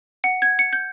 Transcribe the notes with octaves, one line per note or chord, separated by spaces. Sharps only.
F#5
G#6
C#7
G6